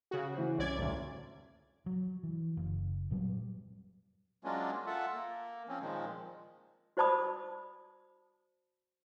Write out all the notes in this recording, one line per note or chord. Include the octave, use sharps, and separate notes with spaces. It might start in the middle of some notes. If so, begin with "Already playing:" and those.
C#3 F#4
E3 C5
C2 C#4 D5 G#6
D#1 D2
F#3
E3
F#1
A#2 F#3 G3
F#3 G#3 A#3 C#4 D4 F4
F4 A4 E5 F#5
A#3
F3 C4 C#4
A#2 D#3 F3 G#3
F#4 C5 D5 A5 B5 D#6